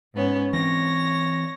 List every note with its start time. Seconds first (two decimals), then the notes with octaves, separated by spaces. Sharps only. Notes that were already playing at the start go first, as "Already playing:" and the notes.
0.15 G#2 B3 C#4
0.53 E3 C4 C#5 A#6